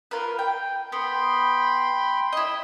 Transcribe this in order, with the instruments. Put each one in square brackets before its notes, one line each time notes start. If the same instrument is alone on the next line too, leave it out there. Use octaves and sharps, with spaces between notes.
[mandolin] F4 A#4 B4
G5
[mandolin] B3 [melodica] G5 B5 C6
[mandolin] E4 D#5